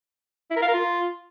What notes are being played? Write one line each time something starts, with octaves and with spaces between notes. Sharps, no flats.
E4
A#4
F5
A#4
F4